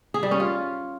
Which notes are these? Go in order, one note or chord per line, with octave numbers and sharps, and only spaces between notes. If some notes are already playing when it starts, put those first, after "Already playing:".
G#4
G3
C#4
F4